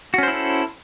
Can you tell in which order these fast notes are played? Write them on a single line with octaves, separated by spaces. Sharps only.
F#4 C#4 C5 E4 A4